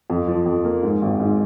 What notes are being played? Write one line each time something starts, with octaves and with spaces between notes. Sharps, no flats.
F2
F3
F2
A#3
G#2
G#1
G#2